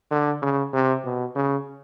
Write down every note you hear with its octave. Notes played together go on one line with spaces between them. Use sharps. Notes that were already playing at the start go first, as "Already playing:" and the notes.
D3
C#3
C3
B2
C#3